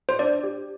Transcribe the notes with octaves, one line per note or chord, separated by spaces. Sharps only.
C5
D4 D5
G4